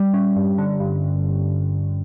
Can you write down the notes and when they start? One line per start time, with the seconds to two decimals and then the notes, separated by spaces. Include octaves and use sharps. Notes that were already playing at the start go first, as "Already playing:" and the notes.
Already playing: G3
0.14 C#4
0.36 G2
0.58 D3
0.80 G2